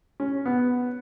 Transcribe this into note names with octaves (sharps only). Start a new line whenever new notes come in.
C#4
B3